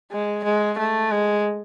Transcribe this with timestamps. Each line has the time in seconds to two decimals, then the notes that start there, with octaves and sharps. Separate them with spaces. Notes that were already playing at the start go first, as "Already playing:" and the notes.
0.12 G#3
0.44 G#3
0.78 A3
1.12 G#3